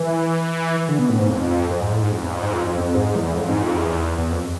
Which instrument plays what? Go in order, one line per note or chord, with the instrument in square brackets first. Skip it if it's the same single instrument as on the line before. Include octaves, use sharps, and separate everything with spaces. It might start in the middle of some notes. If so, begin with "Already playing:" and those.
Already playing: [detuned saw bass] E3
D3
B2
A2
G#2
F2
F2
G#2
A2
G#2
F2
E2
F2
G#2
F2
F2
F2
G#2
E2
F2
G#2
F2
E2
E2
F2